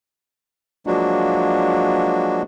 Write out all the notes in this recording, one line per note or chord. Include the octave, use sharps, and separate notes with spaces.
F3 F#3 G#3 A#3 D4 F#4